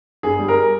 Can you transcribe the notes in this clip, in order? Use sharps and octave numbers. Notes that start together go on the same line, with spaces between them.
G1 G#4
G3
A#4